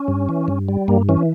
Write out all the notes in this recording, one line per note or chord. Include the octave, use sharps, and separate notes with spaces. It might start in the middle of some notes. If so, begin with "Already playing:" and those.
Already playing: C#4
G2
E3
G2
G3
G2 A#3
E3 C#4